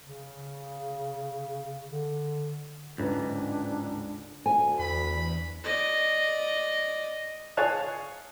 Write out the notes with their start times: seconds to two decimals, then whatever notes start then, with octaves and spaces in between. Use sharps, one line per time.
0.04 C#3
1.87 D3
2.98 D1 C#2 G#2 D4 B4
4.46 D2 G#5
4.79 E2 B5
5.64 D5 D#5
7.57 G#4 C#5 F5 A5 F#6